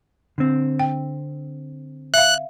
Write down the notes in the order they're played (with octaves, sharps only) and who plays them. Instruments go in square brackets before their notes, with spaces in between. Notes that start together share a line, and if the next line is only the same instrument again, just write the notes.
[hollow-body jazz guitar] D3 C4
[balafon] G5
[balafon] E5 F5 [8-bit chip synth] F#6